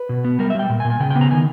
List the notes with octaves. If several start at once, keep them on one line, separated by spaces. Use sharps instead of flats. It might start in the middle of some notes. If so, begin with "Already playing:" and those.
Already playing: B4
B2
B3
G3 A#4
E5
G3 G5
A#2
G#5
A#2
G#5
C#3 G5
G5
B3
A#5
D#3 G#5